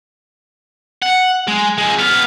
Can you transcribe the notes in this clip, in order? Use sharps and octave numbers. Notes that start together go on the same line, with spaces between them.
F#5
G#3
C#2 G#3
B3 F5